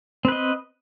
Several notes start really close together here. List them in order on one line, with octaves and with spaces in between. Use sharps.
C4 B4 D#5